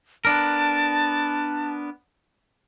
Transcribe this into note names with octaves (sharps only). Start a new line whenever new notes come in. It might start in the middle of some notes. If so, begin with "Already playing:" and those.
B3 D4 A#4 A5